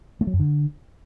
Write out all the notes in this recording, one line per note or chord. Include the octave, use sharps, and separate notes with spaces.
A3
F#3
F#2
D3